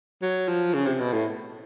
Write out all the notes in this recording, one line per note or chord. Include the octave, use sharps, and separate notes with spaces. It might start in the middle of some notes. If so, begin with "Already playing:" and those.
F#3
F3
C#3
C3
B2
A2